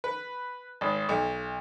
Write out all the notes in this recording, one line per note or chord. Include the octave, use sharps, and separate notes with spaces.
B4
G#1
B1